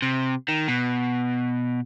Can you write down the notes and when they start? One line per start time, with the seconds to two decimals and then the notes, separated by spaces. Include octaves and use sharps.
0.02 C3
0.48 D#3
0.68 B2